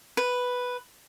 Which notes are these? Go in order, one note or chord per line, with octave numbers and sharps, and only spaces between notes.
B4